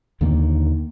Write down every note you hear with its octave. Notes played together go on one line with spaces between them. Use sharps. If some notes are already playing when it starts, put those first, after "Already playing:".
D#2 D3 D#3 A#3